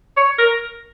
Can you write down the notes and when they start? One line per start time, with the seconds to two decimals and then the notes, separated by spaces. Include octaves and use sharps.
0.17 C#5
0.38 A#4